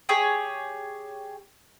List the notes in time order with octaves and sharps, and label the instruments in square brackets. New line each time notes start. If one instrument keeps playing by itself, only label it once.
[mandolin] G4 G#4 C#5 G#5